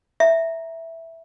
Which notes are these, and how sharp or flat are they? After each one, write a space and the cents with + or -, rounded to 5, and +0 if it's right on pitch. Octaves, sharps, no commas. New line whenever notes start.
E5 +0 A#5 +10